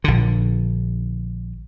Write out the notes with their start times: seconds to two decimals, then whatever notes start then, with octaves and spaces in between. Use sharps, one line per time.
0.04 A#1 D3